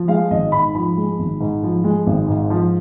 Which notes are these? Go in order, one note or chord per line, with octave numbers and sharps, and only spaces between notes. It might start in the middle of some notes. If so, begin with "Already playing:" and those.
Already playing: F3
G#3 F5
G#1 D#5
G#2 B5
F3 B5
G#3
G#1
G#2
F3
G#3
G#1
G#2
F3